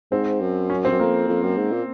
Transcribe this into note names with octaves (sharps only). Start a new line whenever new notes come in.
G#2 C4
F#2
C#4
C4
F#2
F2 A#3
F2
F#2
G#2
A#2